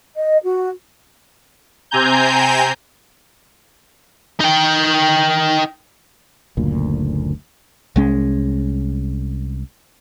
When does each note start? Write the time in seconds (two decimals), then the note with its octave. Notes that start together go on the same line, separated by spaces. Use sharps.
0.15 D#5
0.44 F#4
1.91 C3 C4 G#5 A#5 G6
4.41 D#4 G5
6.57 F#1 D2 A#2
7.96 C2 G#3 C#4